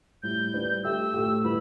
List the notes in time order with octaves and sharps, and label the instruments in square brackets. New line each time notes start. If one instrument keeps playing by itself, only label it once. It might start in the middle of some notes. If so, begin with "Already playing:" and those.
[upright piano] A2 G3 E4 [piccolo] G6
[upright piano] G3 D4 B4 D5
[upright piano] A3 G4 E5 [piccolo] E6
[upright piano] A2 A3 G4
[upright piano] A2 G3 E4 B4 [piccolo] B5